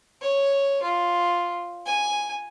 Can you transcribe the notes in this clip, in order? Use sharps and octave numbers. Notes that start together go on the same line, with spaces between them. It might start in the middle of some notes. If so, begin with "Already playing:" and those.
C#5
F4
G#5